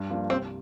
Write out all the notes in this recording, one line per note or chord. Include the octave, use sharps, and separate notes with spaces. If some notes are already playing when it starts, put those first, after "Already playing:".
Already playing: G2
F3 A#3 D4
C2 C4